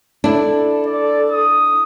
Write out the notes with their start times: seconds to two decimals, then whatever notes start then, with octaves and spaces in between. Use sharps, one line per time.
0.24 D4 E4 A4
0.86 D5
1.32 D#6